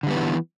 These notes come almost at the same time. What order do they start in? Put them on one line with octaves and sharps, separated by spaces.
D3 G3 B3 E3